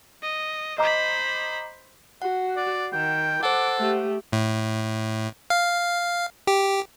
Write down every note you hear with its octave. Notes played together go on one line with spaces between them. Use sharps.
D#5
C5 D#5 A#5 B5 D6
F#4 F#5
D5
D#3 G5
A4 C5 F#5 D6
A3 G4
A2
F5
G4